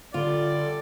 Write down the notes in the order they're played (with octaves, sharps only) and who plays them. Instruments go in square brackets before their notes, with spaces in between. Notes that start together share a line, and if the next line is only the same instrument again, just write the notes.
[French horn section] F#2 G3 A4 [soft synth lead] D3 [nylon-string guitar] F4 [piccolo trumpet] D5